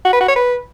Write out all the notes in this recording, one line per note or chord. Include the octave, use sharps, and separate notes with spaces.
F#4
B4
F#4
C#5
B4